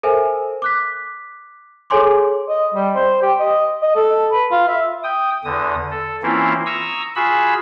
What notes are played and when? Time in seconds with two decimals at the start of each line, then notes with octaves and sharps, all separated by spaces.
0.03 A4 A#4 C5 E5 G#5
0.62 D6 F#6 B6
1.90 G#4 A4 C#5 G#5 C6 D6
2.48 D#5
2.74 G3
2.95 C5
3.22 G4
3.39 D#5
3.82 D#5
3.95 A4
4.31 B4
4.51 F4
4.68 E5
5.04 G5 D#6
5.45 E2 D3 D#6
5.91 A4
6.23 E3 A#3 C4 C#4 E4 F4
6.66 A#5 C#6 D#6 E6
7.16 F4 F#4 G#4 G#5 B5 E6